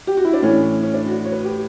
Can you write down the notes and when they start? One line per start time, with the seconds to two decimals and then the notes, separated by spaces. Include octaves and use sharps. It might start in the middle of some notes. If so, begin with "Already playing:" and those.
0.07 G4
0.17 F#4
0.25 E4
0.34 D4
0.42 A2 E3 C#4
0.83 C#4
0.94 D4
1.07 F#4
1.19 F#4
1.25 C#5
1.32 B4
1.44 G4